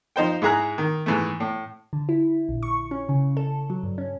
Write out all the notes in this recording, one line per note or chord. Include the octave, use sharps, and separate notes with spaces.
F3 D#4 C5 G5
G#2 E4 G#4 A#5 F#6
D#3
G#2 E3 A3
A2
D3
E4
A#1
C#6
C#4
C#3
A4
F#3
G2
C#4